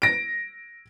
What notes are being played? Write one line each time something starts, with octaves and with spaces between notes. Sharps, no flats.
A#6 D7